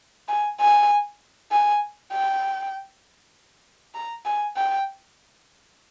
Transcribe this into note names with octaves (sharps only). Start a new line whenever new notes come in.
G#5
G#5
G#5
G5
A#5
G#5
G5